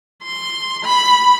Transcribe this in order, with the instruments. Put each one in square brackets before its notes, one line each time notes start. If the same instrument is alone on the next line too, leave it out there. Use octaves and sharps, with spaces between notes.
[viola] C6
B5